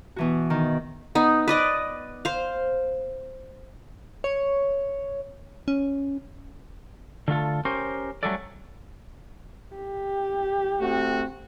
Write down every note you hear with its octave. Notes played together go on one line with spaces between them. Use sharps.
B2 E3 F#4
D#3
B3 D#4
B4 D5 D#5
C5 F5
C#5
C#4
D3 A3 F4 A4
C#4 G4 A#4 C5
F#3 G3 A3 C#4 A4 D5
G4
A3 C4 F#4